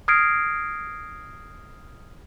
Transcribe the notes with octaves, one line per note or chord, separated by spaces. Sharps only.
D#6 F6 G#6 A#6 C7 D7